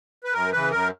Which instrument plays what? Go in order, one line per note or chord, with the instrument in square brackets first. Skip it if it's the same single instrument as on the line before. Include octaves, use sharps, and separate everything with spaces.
[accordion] B4
F#2 A#4
C#3 E3 B4
F#2 A#4